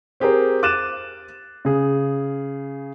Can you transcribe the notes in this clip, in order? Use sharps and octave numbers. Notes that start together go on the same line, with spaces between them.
C4 G4 G#4 A#4 C5
D6 F#6 A6 D#7 E7
C#3 G#4